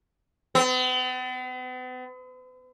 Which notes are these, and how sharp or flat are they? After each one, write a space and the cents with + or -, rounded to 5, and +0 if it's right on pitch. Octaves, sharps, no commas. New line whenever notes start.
B3 +45